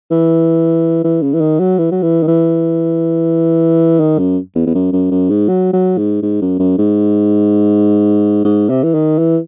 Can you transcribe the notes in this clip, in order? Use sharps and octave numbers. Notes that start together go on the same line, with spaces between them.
E3
E3
C#3
E3
D#3
F#3
E3
F#3
E3
D#3
E3
D#3
F#2
E2
E2
F#2
F#2
F#2
G#2
F#3
F#3
G#2
G#2
F#2
F#2
G#2
G#2
C3
E3
D#3
E3